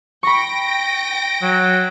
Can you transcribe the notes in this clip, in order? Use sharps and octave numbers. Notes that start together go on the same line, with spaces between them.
G5 B5 C#6 A#6 D7
F#3